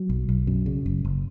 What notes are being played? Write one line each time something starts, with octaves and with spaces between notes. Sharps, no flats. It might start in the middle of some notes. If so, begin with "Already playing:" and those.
Already playing: F#3
B1
B1
F#2
C#3
F#1
F#1